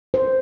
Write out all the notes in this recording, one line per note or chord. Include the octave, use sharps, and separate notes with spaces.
C5